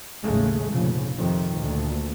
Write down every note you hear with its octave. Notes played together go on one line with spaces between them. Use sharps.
A1 D#2 C#3 G#3 A3
F1 A#2 C#3 F3
F2 C3 D#3 F3
D2 A#2